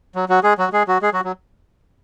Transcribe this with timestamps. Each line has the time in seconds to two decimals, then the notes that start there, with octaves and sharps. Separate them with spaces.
0.15 F#3
0.29 F#3 F#4
0.43 G#3 G#4
0.58 F#3 F#4
0.72 G#3 G#4
0.87 F#3 F#4
1.02 G#3 G#4
1.13 F#3 F#4
1.24 F#3